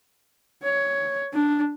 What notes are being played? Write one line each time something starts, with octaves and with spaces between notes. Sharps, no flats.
C#5
D4